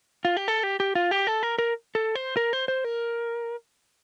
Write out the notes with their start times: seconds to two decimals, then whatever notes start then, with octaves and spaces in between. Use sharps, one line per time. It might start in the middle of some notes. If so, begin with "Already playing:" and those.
0.25 F4
0.37 G4
0.48 A4
0.63 G4
0.80 G4
0.95 F4
1.11 G4
1.27 A4
1.43 A#4
1.59 A#4
1.95 A4
2.15 C5
2.37 A#4
2.53 C5
2.68 C5
2.84 A#4